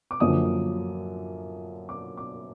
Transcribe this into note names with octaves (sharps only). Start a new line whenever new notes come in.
D6
F#2 D3 F3 A#3 D#6
D6
D6